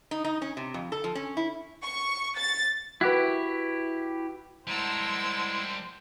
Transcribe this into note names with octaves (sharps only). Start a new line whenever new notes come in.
D#4
D#4
C#4
C3
F2
A4
F3
C#4
E4
C#6
A6
E4 F#4 G4 B4
G3 G#3 E4 A#4 C5 F#5 A5 E6